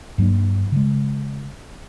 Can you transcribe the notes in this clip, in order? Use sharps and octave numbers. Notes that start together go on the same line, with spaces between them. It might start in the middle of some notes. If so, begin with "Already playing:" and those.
G2 F#3 A#3 D4
C#3 G#3